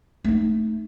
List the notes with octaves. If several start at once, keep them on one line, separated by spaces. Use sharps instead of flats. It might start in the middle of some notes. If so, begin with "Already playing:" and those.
A3 D#4